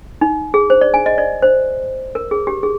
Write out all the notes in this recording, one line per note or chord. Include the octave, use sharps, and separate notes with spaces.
D#4
G#4
C5
D5
G#5
D#5
D5
C5
A#4
G#4
G4
G#4